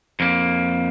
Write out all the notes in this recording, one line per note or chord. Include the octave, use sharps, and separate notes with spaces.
F2 A#3